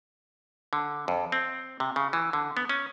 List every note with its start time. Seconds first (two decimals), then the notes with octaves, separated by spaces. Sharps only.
0.73 D3
1.08 F2
1.32 C4
1.80 C3
1.96 C#3
2.13 E3
2.33 D3
2.57 B3
2.69 C#4